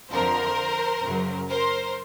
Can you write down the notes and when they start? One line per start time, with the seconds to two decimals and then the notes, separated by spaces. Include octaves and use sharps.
0.11 F2 D3 F3 A#4 C5
1.03 F#2 C#3 F#3
1.49 A#4 C5